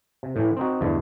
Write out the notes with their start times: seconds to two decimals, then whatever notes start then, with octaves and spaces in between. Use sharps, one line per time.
0.23 C3
0.36 A2 E3
0.57 C4 D#4 F#4
0.81 E2 G2 D3 A3